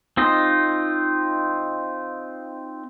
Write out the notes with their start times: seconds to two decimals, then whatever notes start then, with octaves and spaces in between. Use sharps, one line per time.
0.17 C4 D#4 F4 D#5